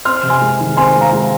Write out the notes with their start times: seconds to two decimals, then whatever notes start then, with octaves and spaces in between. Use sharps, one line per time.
0.05 C4 C6 F6
0.23 C3
0.29 G#5 C6
0.41 G#3
0.60 D#3
0.77 C4 G#5 C6
0.95 G#3
1.01 F5 A#5
1.12 G#3